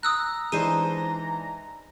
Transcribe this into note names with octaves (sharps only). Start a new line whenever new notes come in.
A#5 D#6 E6 F#6
E3 G#3 D4 D#4 C5 D#7